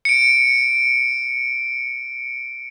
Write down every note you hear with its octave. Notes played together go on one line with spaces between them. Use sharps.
C#7 D7